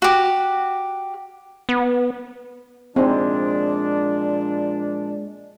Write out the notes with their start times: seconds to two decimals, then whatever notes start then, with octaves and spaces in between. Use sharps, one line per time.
0.02 F#4 G4
1.69 B3
2.96 A#2 F3 G#3 C4 D4 D#4 D5